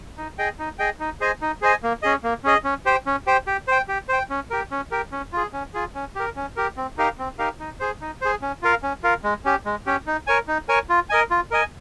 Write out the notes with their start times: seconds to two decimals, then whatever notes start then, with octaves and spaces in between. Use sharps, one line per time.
0.18 D#4
0.38 G#4 D#5 G5
0.59 D#4
0.79 G#4 D#5 G5
1.00 D#4
1.21 G#4 C5 D#5 G#5
1.42 D#4
1.62 G#4 C5 D#5 G#5
1.83 A#3
2.03 C#4 G#4 D#5
2.24 A#3
2.44 C#4 G#4 D#5
2.64 C#4
2.85 G4 C5 G5
3.06 C#4
3.27 G4 C5 G5
3.47 G4
3.68 C5 G5
3.88 G4
4.09 C5 G5
4.30 C#4
4.50 G4 A#4
4.71 C#4
4.91 G4 A#4
5.12 C#4
5.33 F4 G#4
5.53 C#4
5.74 F4 G#4
5.95 C#4
6.15 G4 A#4
6.36 C#4
6.57 G4 A#4
6.77 C4
6.98 D#4 G4 A#4 F5
7.19 C4
7.39 D#4 G4 A#4 F5
7.60 D#4
7.80 G#4 C5
8.01 D#4
8.21 G#4 C5
8.42 C#4
8.62 F4 A#4 F5
8.83 C#4
9.03 F4 A#4 F5
9.24 G#3
9.45 C#4 G4
9.66 G#3
9.86 C#4 G4
10.07 D#4
10.27 A#4 C#5 G#5
10.48 D#4
10.69 A#4 C#5 G#5
10.90 F4
11.10 A#4 D#5 G#5
11.31 F4
11.51 A#4 D#5 G#5